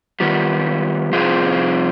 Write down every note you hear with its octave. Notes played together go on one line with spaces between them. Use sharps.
D#3 G3 B3 F4
C3 F3 C4 F4 G#4